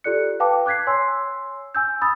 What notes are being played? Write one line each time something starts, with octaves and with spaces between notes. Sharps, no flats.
F4 G4 A4 D5 F#6 C#7
B4 F5 G5 A5 D6
D6 F#6 G#6 B6 C7
C#5 G#5 C6 E6
G#5 E6 G6
B5 D#6 A6